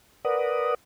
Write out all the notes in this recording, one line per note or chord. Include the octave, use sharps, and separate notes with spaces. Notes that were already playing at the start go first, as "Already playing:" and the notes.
A#4 B4 D5 F#5 D#6